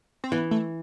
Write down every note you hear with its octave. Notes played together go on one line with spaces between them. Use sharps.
C4
E3 B3
A3